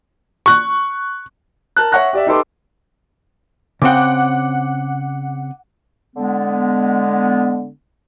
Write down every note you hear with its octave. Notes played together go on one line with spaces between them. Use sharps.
C#6 F#6
A#4 A5 F#6
C#5 E5 F#5 C#6 F#6 A#6
G4 D5 E5
D#4 G4 A4 B4 C6 D6
C#3 C4 F#5 G5 D6
D3 G#3 B3